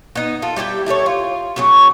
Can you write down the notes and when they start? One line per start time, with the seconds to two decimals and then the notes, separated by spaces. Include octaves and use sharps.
0.15 B3 D#4
0.42 F4 A4
0.56 G3 E4 G4 G5
0.86 E4 G4 A4 C#5
1.06 F4
1.56 C#3 F#3 C#4